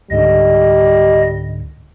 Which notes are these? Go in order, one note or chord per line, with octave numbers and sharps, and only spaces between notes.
C#2 G#2 D3 G3 D#5